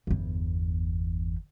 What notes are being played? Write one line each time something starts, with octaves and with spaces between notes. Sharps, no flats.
G1 E2